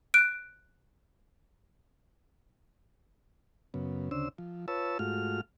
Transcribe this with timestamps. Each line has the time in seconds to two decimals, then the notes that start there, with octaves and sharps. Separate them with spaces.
0.14 F#6 D7
3.74 F#2 C#3 B3
4.11 D2 C#3 D4 C5 E6
4.38 F3
4.68 F4 B4 C#5 A5 E6
4.99 G#2 A3 F4 F#4 F6